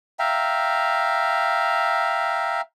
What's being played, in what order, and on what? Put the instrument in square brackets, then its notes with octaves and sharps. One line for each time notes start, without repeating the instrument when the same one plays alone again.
[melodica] E5 F5 G5 A#5